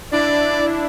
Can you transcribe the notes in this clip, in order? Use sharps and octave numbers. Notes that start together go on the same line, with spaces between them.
D4 E4 D5